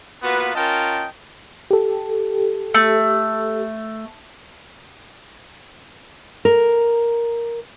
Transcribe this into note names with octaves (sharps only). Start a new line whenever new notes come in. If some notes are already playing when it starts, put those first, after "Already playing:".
A#3 B3 F4 F#4 B4
C#4 F4 A#4 D#5 G5 A5
G4 A4
A3
A#4